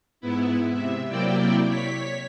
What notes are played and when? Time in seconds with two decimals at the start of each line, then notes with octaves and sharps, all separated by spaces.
0.21 G#2 B3 E4
0.69 C3 E5
1.08 C3 F#3 A#3 E4 D5 G5
1.67 C#5 B6